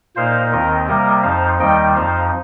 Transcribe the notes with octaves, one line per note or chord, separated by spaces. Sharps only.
A#2 A#3 D#4 C5 F5
D#2 D#3 C4 A#4 D#5
C3 G3 A#3 A#4 D#5
F2 F3 D#4 C5 F5
D#2 D#3 G3 D#4 D#5 G5
F2 F3 D#4 C5 F5